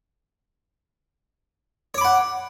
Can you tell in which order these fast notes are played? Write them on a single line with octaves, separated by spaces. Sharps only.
C#5 D6 B5 F#5